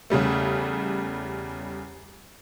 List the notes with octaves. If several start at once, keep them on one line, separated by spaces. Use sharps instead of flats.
E2 C#3 G3 A3